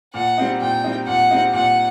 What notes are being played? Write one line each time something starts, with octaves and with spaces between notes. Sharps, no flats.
A#2 F#5
G3 C4 D#4
A#2 G5
G3 C4 D#4
A#2 F#5
G3 C4 D#4
A#2 F#5